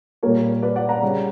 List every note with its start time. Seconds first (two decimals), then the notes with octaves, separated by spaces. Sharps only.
0.23 A#2 G3 A#3 A#4 C#5
0.62 B4 D5
0.76 D5 F#5
0.89 F#5 A#5
1.02 C#3 G3 C#4